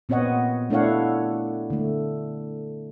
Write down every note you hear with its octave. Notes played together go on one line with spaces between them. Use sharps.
A#2 B3 C4 C#5 D#5 F#5
A3 D4 E4 C#5 F5 F#5
D3 A3